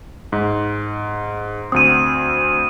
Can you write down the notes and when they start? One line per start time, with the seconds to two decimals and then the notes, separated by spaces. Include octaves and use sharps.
0.32 G#2
1.72 D2 C4 D#6 D#7